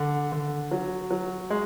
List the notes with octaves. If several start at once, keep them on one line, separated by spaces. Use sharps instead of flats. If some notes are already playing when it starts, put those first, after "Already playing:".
Already playing: D3
D3
F#3
F#3
G#3